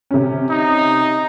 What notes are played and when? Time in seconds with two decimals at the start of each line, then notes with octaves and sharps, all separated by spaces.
0.11 C3 C#4
0.50 D#4